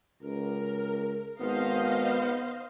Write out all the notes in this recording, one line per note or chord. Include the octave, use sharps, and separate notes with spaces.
C#2 A#4
G#1 B3 C5 D#5 F5